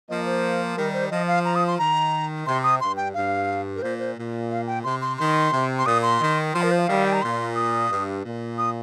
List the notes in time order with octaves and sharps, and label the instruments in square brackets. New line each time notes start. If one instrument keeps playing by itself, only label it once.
[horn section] F3 A#3 [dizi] D#5
[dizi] C5
[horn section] D#3 G3 [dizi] A#4
[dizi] C5
[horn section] F3 [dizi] D#5
[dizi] F5
A#5
D#6
C6
[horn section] D#3 [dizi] A#5
[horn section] C3 [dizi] C6
[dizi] D#6
[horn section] G2 [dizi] C6
[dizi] G5
[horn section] G2 [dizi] F5
[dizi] A#4
[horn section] A#2 [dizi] C5
[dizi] C5
[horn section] A#2
[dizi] F5
G5
[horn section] C3 [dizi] C6
[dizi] C6
[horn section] D#3 [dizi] C6
[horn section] C3
[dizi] C6
[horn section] A#2 [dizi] D#6
[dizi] C6
[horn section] D#3
[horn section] F3 [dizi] C6
[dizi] A#4
C5
F5
[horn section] D#3 G3
[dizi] G5
A#5
[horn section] A#2 [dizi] C6
[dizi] D#6
[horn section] G2
A#2
[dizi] D#6